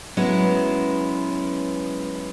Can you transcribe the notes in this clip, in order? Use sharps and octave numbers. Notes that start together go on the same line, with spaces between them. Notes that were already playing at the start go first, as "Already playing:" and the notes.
F#3 G#3 B3 C#4 E4